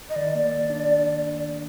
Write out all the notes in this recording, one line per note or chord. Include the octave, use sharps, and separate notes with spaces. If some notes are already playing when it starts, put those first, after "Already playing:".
D#5
D#3 D5
A#3
D4